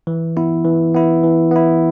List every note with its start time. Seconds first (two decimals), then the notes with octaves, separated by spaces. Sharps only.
0.07 E3
0.37 B3 E4
0.64 E3
0.95 B3 E4
1.24 E3
1.51 B3 E4